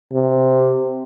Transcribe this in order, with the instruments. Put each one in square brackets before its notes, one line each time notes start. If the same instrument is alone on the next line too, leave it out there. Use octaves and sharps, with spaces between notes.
[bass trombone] C3